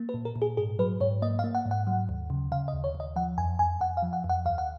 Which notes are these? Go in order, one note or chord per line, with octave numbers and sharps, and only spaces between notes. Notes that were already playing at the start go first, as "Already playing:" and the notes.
Already playing: A#3
B4
A#2
A#4
A#2
G#4
G#2 G#4
F#3 B4
G#2 C#5
A#3 D#5
F5
A#3
F#5
G#2
F#5
F#3
D#2
C#3
C#3 F5
D#5
D#2
C#5
D#2
D#5
F3 F#5
F2 G#5
F2 G#5
F2 F#5
F5
F3
F#5
F2
F#5
D#2 F5
F#5